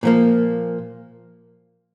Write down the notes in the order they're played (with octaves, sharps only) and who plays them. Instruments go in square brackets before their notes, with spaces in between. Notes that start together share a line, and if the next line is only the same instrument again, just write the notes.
[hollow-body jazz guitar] A#2 F3 A#3